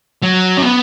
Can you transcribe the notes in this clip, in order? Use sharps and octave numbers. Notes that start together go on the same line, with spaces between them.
F#3
C#4
B3